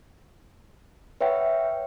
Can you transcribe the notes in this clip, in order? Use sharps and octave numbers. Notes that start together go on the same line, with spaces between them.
B4 C#5 E5 F#5 G5